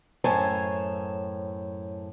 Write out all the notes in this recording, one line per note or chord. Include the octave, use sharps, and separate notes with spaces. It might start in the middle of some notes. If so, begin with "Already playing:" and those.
F#2 A2 C5 C#5 G#5 A5